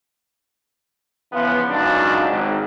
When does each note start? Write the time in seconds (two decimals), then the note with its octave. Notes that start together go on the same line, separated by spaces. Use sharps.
1.32 C#3 E3 F3 B3
1.70 C#2 F#2 C#3 D4 D#4 F#4
2.29 G#1